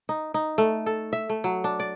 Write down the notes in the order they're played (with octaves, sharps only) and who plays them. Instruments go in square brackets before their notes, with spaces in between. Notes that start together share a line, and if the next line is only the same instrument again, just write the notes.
[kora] D#4
D#4
A3
A4
E5
A3
F#3
D4
D5